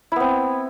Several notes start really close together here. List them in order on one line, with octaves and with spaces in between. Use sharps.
E4 B3 C4